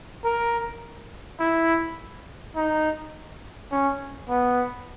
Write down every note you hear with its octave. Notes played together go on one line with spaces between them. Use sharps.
A#4
E4
D#4
C#4
B3